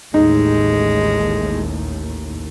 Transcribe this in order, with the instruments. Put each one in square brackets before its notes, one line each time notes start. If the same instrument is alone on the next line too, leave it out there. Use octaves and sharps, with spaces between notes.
[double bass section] A1 D#2 A2 [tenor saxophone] G#3 [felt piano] D#4